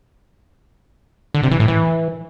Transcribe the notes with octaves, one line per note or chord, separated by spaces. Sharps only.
D3
C3
E3
A2
E3